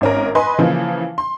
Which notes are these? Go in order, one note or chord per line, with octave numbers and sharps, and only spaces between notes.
G#1 C#4 A#4
B4 D#5 G#5 B5 C6
C#3 E3 F3 A#3
C6